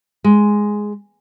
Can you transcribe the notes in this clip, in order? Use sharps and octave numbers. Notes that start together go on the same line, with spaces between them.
G#3